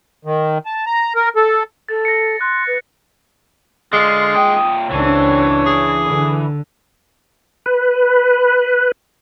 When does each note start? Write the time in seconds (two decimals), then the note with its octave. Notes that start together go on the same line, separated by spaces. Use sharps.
0.25 D#3
0.66 A5
0.86 A#5
1.16 A#4
1.36 A4
1.89 A4 A6
2.05 A#6 C#7
2.41 C6 F#6
2.67 B4
3.93 D3 G#3 F4
4.35 A#2 G5 D#6
4.90 C#2 E3 C4 D4 C#5
5.66 G#4
6.06 D3
7.66 B4